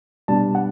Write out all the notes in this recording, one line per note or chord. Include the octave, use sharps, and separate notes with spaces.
B2 G3 D4 A5
F#5